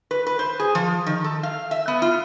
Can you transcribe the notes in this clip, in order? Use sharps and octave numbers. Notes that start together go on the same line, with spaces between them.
B4
B4
C5
G#4
F3
D#3
A4
F5
E5
B3
F4